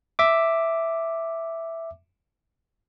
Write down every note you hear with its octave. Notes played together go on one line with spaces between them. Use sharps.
E5 D6